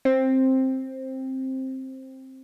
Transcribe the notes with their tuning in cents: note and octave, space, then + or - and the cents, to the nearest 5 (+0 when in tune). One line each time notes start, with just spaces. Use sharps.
C4 +10